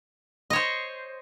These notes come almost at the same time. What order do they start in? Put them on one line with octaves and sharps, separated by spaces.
D#5 C#5 C5